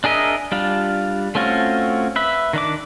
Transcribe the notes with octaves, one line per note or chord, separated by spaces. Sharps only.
D4 G#4 A#4 D#5 E5
G3 D4 F4
A3 C4 C#4 F4 F#4
B4 E5
D#3 D4 D6